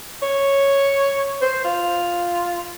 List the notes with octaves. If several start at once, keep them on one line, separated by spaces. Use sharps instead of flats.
C#5
C5
F4